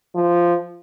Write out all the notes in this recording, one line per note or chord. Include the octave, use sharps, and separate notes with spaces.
F3